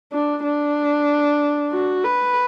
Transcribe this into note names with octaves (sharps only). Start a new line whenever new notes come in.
D4
D4
F#4
B4